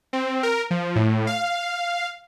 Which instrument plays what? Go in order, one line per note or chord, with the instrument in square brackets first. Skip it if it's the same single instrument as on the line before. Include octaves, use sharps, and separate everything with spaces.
[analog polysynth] C4
A#4
F3
A2
F5